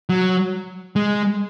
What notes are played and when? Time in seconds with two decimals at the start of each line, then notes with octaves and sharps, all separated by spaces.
0.09 F#3
0.96 G#3